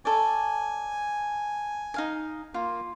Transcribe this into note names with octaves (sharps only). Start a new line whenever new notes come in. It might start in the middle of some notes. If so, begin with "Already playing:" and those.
A4 C#5 D5 G#5
D#4 F5 G#5
A#3 F4